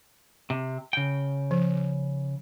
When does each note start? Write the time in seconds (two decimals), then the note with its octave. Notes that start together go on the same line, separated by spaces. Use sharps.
0.50 C3
0.93 C#3 G5
1.51 F3